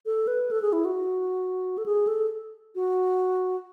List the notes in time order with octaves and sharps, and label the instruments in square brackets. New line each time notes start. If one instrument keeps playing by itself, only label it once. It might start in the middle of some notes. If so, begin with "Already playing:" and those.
[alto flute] A4
B4
A4
G#4
E4
F#4
A4
G#4
A4
F#4